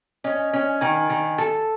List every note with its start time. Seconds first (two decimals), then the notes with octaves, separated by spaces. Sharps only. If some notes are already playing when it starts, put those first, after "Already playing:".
0.24 C#4 D#5
0.53 C#4
0.81 D#3 G#5
1.10 D#3
1.38 A4 A5